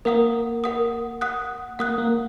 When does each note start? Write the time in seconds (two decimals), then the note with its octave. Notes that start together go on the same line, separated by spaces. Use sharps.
0.05 A#3 A#4 F#5 D#6
0.64 A#4 F#5 D#6
1.21 F#5 D#6 F#6
1.79 A#3 F#5 D#6 F#6
1.98 A#3